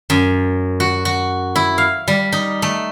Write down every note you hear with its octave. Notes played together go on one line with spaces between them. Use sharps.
F#2
F#4
F#4
E4
F5
G3
D#4
A3